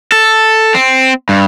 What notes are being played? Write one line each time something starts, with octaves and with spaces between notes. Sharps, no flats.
A4
C4
G2